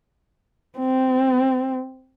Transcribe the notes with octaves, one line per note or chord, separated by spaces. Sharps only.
C4